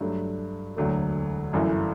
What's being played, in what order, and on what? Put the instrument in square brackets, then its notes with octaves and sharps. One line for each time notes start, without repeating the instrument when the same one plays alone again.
[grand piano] G2 F#3 A3
E1 D2 D3 F#3 A3
G1 F#2 E3 A3 E4